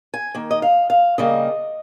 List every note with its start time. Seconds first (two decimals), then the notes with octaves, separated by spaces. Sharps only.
0.14 G#5
0.35 D#3 A#3
0.51 D#5
0.62 F5
0.90 F5
1.18 C#3 G3 A#3 D#5